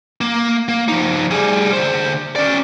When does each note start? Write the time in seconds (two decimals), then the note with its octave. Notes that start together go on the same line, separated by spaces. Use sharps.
0.21 A#3
0.68 A#3
0.88 F3 D#4
1.31 G3 G#4
1.73 D3 C5
2.36 C#4 D5